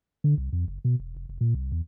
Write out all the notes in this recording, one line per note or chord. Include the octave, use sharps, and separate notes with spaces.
D3
C2
F2
F#1
B2
E1
F1
F1
A#2
C2
E2